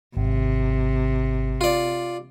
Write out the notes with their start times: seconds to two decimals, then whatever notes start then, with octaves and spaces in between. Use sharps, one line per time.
0.17 G#1 C3
1.61 F4 D5